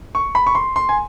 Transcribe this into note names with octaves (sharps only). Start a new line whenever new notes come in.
C#6
B5
C#6
C6
C6
G#5